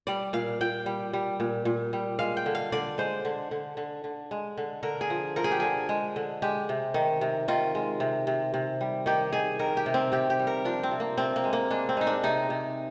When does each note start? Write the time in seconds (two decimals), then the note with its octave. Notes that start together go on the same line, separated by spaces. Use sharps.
0.07 G3 D5
0.33 A#2 F5
0.61 A#2 G5
0.86 G3
1.13 G3
1.40 A#2
1.65 A#2
1.93 G3
2.19 G#3 F5
2.37 G5
2.46 D3
2.55 F5
2.72 D3 D5
2.98 G#3 C5
3.25 D3
3.51 D3
3.77 D3
4.04 D3
4.31 G#3
4.57 D3
4.83 D3 A#4
5.01 G#4
5.10 F3
5.36 F3 A#4
5.44 G#4
5.51 G4
5.60 D3 G#4
5.89 G#3
6.16 D3
6.42 G#3 G4
6.69 C3
6.94 D#3
7.21 C3
7.48 D#3 F4
7.75 G#3
8.00 C3
8.27 C3
8.54 C3
8.81 G3
9.06 D#3 G4
9.33 D#3 G#4
9.59 D#3 A#4
9.77 G4
9.86 C3
9.94 C4
10.12 C3 G4
10.30 G4
10.39 G3
10.47 A#4
10.65 F3 D4
10.83 C4
10.91 C3
11.00 A#3
11.17 C3 C4
11.36 A#3
11.44 G#3
11.53 A#3
11.70 G#3 D4
11.89 C4
11.97 G#3 D#4
12.07 D4
12.23 C3 D#4
12.50 C3